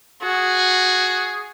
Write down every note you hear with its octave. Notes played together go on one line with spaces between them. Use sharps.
F#4 G#4